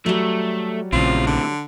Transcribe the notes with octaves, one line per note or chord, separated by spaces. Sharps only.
F#3 G3 A3
A#1 A2 C#3 C4 F4
D3